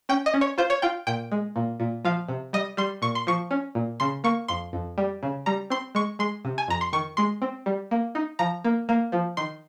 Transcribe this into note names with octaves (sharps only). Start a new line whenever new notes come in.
C#4 G5
D#5
C#4
C#5
F4 C5
C#5
F4 G5
A#2 G5
G#3
A#2
A#2
F3 F5
C3
G3 D#5
G3 C6
A#2 C#6
C6
F3 C#6
C#4
A#2
C#3 C6
A#3 C#6
F2 C6
F2
G3
C#3
G3 A#5
C4 C6
G#3 C#6
G#3 C6
C3
G#5
F2 A#5
C6
D#3 C#6
G#3 C6
C4
G3
A#3
D#4
F3 A#5
A#3
A#3
F3
D#3 C6